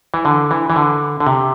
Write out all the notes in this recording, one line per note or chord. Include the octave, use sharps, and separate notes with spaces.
E3
D3
E3
E3
D3
D3
C3